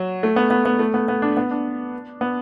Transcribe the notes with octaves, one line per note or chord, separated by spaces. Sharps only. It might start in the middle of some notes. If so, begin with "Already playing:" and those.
Already playing: F#3
A3
B3
B3
B3
A3
B3
B3
D4
B3
D4
B3